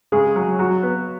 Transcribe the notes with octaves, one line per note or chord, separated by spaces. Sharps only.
C#3 G#3 G#4
F#3
F#3 F#4
B3